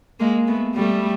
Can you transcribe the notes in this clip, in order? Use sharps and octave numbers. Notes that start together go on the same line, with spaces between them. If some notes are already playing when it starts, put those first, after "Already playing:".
G#3 A#3
A3 B3
G3 A3